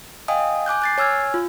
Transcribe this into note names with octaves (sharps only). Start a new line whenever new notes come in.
D#5 F5 G5 G#5 D#6
G#5 D6 F#6 G6
F#6 A6 C7
C#5 G#5 E6 F6 G#6
F4